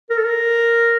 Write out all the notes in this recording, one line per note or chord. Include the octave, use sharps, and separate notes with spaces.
A#4
A4
A#4